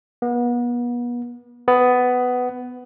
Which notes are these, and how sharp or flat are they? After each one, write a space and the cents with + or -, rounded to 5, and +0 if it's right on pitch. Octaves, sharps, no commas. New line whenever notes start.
B3 -35
B3 +15